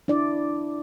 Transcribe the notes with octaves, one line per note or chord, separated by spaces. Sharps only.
D4 E4 D5